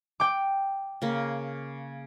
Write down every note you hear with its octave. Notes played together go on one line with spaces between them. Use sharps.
G5 D6
C#3 A#3